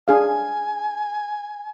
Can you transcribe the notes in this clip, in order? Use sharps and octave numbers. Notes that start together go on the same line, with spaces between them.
D4 G#4 F5 G#5